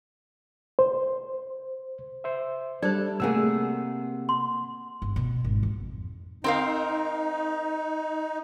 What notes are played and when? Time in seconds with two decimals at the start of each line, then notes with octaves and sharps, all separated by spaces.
0.79 C5
2.24 C5 E5
2.82 G3 D4 A4 C5 D5
3.20 C3 A3 A#3 G#4 F#5 E6
4.29 C6
5.02 G1
5.16 B2
5.44 G#1
5.63 F2
6.44 C4 D#4 A#4 F5